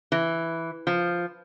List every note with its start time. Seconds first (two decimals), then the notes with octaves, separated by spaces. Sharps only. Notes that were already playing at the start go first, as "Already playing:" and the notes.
0.12 E3
0.87 F3